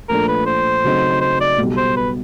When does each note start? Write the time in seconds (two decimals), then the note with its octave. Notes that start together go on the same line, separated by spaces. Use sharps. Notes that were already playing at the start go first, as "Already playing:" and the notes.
0.09 A#2 F3 A3 D4 A#4
0.28 B4
0.46 C5
0.84 C#3 F#3 A3 C4 D#4
1.21 C5
1.41 D5
1.58 B1 B2 G3
1.77 C5
1.97 B4